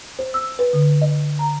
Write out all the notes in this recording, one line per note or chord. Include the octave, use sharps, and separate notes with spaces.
C5
E6
B4
D3
D#5
A#5